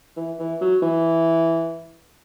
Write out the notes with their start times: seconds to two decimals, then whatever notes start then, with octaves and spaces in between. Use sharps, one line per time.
0.17 E3
0.39 E3
0.61 F#3
0.82 E3